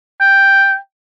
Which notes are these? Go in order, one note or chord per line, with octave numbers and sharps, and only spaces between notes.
G5